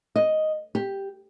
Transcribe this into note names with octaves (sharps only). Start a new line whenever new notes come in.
D#5
G4